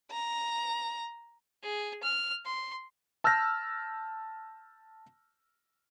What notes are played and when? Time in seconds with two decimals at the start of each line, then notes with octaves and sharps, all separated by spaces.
0.12 A#5
1.63 G#4
2.03 F6
2.45 C6
3.24 A5 E6 F6 G6 A#6